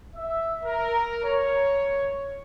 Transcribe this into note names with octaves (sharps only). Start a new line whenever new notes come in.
E5
A#4
C#5